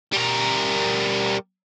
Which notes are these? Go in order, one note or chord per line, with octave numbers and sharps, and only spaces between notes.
G3 A#4